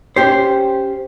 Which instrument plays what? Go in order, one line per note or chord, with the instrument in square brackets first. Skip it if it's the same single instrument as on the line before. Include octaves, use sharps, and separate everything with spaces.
[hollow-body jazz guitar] C#4 G4 C5